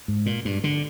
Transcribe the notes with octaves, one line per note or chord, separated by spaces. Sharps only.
G#2
A#2
G2
D3